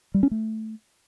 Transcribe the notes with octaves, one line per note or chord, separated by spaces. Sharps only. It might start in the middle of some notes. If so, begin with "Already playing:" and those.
G3
C#4
A3